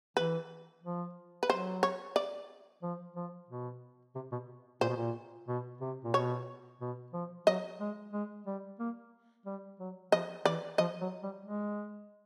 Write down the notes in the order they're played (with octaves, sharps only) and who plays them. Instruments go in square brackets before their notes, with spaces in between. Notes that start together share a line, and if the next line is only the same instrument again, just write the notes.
[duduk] E3 [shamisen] B4
[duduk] F3
[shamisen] B4
[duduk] F#3 [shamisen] C5
[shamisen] C#5
D5
[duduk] F3
F3
B2
C3
B2
[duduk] A#2 [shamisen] C5
[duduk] B2
A#2
B2
C3
A#2
[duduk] B2 [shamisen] C#5
[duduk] B2
F3
[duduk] F#3 [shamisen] D#5
[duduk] G#3
G#3
G3
A#3
G3
F#3
[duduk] F3 [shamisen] D#5
[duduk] E3 [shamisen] D5
[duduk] F3 [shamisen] D#5
[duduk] F#3
G3
G#3